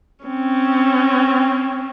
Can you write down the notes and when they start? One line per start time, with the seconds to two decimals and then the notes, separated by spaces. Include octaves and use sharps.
0.25 C4 C#4